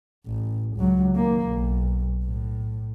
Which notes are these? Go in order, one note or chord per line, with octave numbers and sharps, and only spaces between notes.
A1
C#2 F#3
D#3 A#3
B1
A2